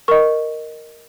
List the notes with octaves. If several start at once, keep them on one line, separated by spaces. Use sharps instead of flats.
A#4 D#5 C#6